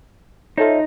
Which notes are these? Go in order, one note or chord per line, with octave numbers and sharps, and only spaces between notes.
D#4 F4 A4 C5 C#5 D#5 E5